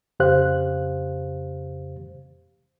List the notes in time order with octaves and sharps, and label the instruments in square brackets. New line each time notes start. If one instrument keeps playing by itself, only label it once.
[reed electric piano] F2 C#3 G4 C5 F5 F#6